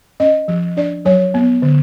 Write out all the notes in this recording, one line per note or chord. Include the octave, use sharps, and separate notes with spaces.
C#4 D#5
F3
D4 D5
F#3 C#5
B3
D3